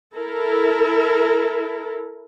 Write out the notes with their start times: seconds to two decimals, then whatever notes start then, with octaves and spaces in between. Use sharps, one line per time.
0.16 E4 A4 A#4